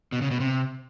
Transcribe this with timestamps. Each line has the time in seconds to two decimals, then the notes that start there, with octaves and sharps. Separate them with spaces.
0.12 B2
0.22 C#3
0.31 B2
0.40 C3